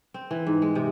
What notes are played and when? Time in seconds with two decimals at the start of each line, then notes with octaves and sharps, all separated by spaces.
0.14 C4
0.31 E3
0.47 G#2
0.62 G#3
0.75 C3